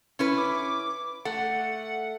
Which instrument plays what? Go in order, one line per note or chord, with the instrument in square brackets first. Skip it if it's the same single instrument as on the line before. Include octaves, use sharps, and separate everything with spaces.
[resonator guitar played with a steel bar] C#4 E4 B4
[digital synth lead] D6
[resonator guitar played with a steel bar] A3 [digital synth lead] F#5